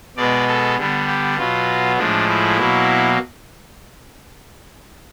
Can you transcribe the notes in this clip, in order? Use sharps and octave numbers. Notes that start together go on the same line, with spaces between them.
B2 G#3 B3 D5
A4
D3 G3 B3
G4
B2 F#3 B3 F4
A2 F3 G#3 D4
E4
B2 F#3 A#3